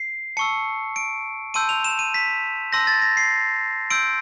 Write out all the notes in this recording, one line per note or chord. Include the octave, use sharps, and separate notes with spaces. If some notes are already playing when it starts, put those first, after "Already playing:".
Already playing: C7
A5 C#6 E6 C#7
D7
A5 C6 E6 G6 D#7
F7
E7
D#7
B6
A5 C6 E6 G6 A#6
A6
A#6
C7
C6 E6 G6 D7